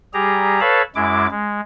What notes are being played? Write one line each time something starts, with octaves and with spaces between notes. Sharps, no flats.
G3 G4 G#4 A#5
A4 B4 C#5 F5 A5 B5
F#2 G#3 E4 D6
G#3